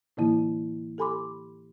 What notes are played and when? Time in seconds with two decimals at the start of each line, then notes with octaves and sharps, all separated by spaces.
0.17 A2 D3 E3 A#3 E4
0.98 G4 A4 G#5 B5 C6 D6